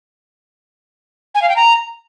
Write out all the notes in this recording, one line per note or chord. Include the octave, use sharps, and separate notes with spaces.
G#5
F5
G5
A#5